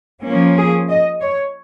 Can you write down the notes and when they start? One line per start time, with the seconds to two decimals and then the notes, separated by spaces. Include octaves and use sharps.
0.24 F3 A#3 C#4
0.57 G#4
0.89 D#5
1.21 C#5